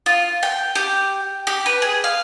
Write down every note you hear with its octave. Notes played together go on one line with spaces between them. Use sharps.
F4
G5
G4
G4
B4
G#4
F5